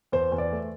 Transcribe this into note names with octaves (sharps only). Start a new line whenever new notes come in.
E2 C5
E2
D5
A3